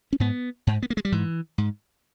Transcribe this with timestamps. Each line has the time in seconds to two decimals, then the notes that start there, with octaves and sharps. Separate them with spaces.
0.13 C#4
0.20 G#2 B3
0.67 G#2
0.83 B3
0.90 A#3
0.97 G#3
1.05 G3
1.12 G#2 E3
1.58 G#2